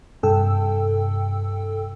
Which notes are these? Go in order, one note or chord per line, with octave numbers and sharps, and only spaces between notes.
G2 C3 A4 G5 E6